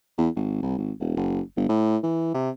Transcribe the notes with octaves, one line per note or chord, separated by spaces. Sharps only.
E2
G#1
C2
G#1
E1
F#1
G1
A2
E3
C3